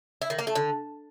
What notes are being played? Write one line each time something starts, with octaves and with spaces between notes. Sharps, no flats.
E4
D#3
A#3
A3
D3